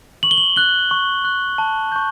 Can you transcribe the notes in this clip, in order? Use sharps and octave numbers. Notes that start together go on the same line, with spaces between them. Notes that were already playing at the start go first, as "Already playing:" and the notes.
C#6 F#7
G7
F#7
F#6 G7
C#6
F#6
A5
C#6 G6